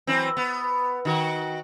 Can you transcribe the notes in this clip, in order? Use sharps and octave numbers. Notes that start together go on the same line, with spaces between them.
E3 F#3 C4
B3
D#3 F#4